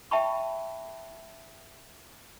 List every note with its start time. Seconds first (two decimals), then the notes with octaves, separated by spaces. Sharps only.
0.11 E5 G5 A5 B5 C#6